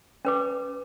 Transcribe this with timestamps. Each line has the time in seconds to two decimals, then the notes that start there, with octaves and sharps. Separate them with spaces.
0.25 C#4 B4 D6